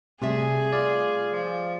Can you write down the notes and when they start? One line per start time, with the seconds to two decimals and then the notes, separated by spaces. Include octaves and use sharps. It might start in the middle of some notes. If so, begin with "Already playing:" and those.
0.22 C3 G3 A3 G#4 E5
0.73 F4 D5
1.33 F3